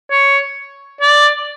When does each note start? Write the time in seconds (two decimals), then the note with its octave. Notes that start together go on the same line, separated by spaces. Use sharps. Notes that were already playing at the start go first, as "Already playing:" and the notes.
0.11 C#5
1.01 D5